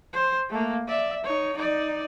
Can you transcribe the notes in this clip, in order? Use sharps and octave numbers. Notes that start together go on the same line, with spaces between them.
C5
A3 A#3
D5 E5
D#4 C#5
D#4 D5